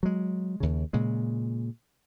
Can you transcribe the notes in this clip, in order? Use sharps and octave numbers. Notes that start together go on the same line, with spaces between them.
F#3 G#3
D#2 C#3
A#2 C#3 G#3